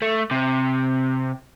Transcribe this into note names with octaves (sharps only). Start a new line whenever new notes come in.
A3
C3